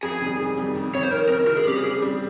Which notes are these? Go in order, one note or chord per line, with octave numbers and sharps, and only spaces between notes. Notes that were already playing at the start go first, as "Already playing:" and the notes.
F2 G#4
C3 D#3 G3
F2
C3 D#3 G3
F2
C3 D#3 C#5
C5
F2 A#4
C3 D#3 A#4
C#3 A#4
G#4
G3 C4 G4
G#4
C#3
G3 C4